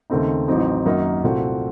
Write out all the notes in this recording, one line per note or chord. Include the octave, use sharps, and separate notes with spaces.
D#2 C#3 A3 C4 D#4
A1 A2 F#3 C4 D#4
F#2 D#3 A#3 D#4 F#4
C2 A#2 A3 C4 F#4